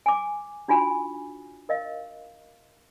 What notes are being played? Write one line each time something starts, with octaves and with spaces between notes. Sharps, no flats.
G#5 D6
D4 D#4 F4 F#4 G#5 C#6
A#4 D#5 F5